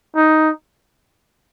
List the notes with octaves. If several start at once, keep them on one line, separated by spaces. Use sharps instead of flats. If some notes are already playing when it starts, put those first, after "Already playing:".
D#4